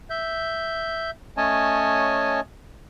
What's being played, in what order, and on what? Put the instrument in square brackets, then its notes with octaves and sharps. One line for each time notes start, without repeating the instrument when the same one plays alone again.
[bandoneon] E5 G6
A3 C#4 C#5 D#5 G#5 A5